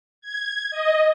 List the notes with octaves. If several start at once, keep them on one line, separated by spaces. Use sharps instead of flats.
G#6
D#5